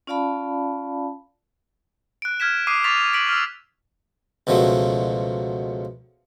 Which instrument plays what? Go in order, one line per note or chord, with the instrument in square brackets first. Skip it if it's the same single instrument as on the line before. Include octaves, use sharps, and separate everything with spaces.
[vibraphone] C#4 F4 D5 F5 A5 B5
[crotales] F#6 D7
F6 G#6 B6 E7
D6 D#6 C7 D#7
C#6 D6 A6 B6 F7
B6 D7 F#7
E6 F6
[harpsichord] C#2 B2 F3 F#3 A3